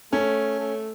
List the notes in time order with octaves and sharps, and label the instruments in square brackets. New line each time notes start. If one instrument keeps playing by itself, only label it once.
[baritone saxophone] A3 [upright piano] C#4
[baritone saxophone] A3